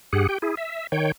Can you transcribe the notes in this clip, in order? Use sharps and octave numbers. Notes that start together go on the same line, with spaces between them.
G2 G4 G#4 F#5
G4 G5
E4 G#4
E5
D#3 C#5 G5